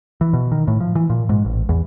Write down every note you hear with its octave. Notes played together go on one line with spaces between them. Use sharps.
E3
B2
D#3
A2
F3
E3
A#2
G#2
A1
E2